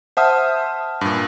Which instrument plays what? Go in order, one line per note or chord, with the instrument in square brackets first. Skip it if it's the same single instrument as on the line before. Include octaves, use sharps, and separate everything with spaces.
[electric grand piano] C5 E5 D#6 [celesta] F#5 A5 F6
[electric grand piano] G2 A#2